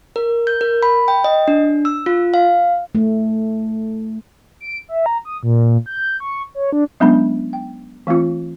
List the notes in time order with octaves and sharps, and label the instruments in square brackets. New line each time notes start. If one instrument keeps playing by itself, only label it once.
[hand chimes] A#4
G6
A#4
B5
G5
D#5
D4
E6
F4
F5
[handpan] A3
[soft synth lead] D7
E5
A#5
D#6
A#2
G6
C#6
C#5
D4
[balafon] F#3 G#3 B3 C#4 D4 B5
G5
E3 A3 C4 F4